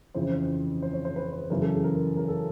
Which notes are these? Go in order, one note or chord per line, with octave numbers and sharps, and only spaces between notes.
F2 C#3 E3 C5
C5
C5
C#5
C5
B4
C5
F#2 C#3 E3 A#4
A4
G#4
A#4
A#4
A4